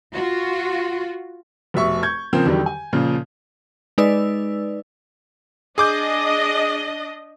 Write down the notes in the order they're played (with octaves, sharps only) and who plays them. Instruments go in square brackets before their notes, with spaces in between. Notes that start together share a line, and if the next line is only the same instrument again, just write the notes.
[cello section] F4 F#4
[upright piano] F1 B2 E5 C#6
C#6 G6 G#6
C#3 F3 A#3 C4
E2 D3 D#3 F#3 G3
G#5
A#2 C#3 F3 F4
[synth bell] G#3 D#4 B4 D5 E6
[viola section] D4 D#5 [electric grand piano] G#4 D6 G6